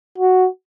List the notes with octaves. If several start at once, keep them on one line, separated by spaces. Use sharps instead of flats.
F#4